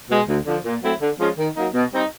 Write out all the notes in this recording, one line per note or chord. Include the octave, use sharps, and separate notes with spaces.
B2 G#3
D2
D3 F3
A#2
F#3 A3 C4 E4
D3
F3 G#3 C#4 F4
D#3
F#3 A#3 D#4
B2
G3 C4 D#4